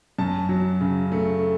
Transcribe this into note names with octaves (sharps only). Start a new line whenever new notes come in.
F#2 A5
F#3
C#3
A3